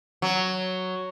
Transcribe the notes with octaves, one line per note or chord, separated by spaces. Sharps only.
F#3